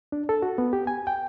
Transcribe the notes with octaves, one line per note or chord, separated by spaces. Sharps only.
D4
A4
F#4
B3
G4
G#5
G5